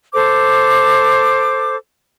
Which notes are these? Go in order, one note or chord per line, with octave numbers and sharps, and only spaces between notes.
A4 C5 D6